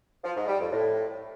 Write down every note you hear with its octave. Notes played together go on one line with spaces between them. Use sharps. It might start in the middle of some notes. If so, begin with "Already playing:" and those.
F3
G#2
G3
F2
A2